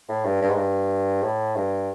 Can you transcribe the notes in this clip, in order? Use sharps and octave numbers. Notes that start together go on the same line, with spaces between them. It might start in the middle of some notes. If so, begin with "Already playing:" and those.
A2
G2
G2
G#2
G2
A2
G2